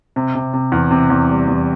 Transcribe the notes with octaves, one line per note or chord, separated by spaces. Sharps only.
C3
C3
C3
E2
C3
E2
G3
E2